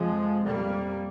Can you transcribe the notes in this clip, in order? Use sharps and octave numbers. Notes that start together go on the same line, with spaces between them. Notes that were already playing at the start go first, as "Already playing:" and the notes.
Already playing: F2 C3 F3 G#3
F2 C3 G3 A#3